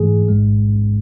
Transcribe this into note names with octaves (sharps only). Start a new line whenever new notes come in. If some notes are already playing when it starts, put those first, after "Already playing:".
Already playing: G#2 E3 A3 G#4
A1 G#2 G#3